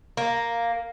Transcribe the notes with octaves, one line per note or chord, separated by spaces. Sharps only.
A#3